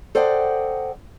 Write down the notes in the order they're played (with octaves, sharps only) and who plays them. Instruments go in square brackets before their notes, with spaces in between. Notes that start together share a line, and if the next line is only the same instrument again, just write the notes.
[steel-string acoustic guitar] A4 C5 D5 D#5 F#5 G5